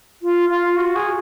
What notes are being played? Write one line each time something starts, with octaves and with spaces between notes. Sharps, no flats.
F4
F4
F#4
G#4